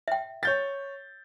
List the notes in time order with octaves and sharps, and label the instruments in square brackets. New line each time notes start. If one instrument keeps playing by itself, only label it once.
[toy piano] E5 G5
[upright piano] C#5 G6 A6